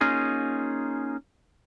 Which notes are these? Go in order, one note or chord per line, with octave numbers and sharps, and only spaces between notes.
A#3 C#4 D#4 F4 G#4